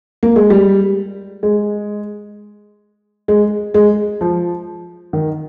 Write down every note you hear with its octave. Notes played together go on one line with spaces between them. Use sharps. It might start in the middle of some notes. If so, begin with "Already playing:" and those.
A#3
G#3
G3
G#3
G#3
G#3
F3
D#3